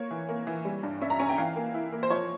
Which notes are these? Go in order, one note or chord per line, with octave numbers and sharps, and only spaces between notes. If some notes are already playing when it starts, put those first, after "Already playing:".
Already playing: A#3 C#5
E3
A#3
E3
G3
G2
C#4 E5
A#5
C#4 G#5
G5
E3 F5
A#3
E4
A#3
C5
F3 C#5